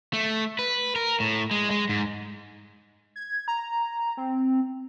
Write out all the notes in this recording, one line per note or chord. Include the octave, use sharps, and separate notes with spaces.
A3
B4
A#4
A2
G#3
G#3
G#2
G#6
A#5
C4